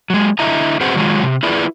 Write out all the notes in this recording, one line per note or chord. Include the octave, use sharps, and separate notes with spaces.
F#3 G#3
D3 E4 D#5 E5 A#5
C4 F#4 G#4 B4 C5 F#5
D#3 F#3 G#3 F4
C3
E4 F4 G#4 B4 D5